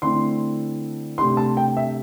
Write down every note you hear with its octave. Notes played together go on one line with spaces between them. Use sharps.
D3 A3 C4 E4 C6
C3 A3 D4 G4 C6
A5
G5
E5